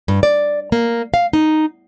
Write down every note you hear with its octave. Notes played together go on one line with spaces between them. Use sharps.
G2
D5
A#3
F5
D#4